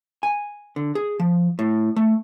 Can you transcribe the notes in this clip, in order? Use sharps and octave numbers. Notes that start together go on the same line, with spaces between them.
G#5
D3
G#4
F3
A2
A3